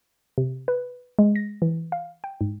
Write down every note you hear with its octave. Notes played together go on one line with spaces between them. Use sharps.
C3
B4
G#3
A#6
E3
F5
G5
G#2